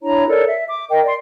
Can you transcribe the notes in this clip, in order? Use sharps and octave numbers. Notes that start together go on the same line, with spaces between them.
D4 E4 C#5 A#5
A4 A#4 C#5 D5
E5
D6
A#4 D#5 G5
D5 C6